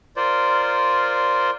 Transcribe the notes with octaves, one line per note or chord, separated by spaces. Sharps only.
F4 A#4 C5 D5